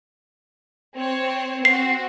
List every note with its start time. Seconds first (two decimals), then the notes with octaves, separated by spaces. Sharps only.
0.97 C4 C5 C#5
1.65 C4 F#4 C7